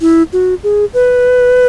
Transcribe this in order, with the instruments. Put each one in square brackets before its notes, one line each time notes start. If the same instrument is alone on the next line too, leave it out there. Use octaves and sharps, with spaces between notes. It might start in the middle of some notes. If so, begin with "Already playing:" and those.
[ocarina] E4
F#4
G#4
B4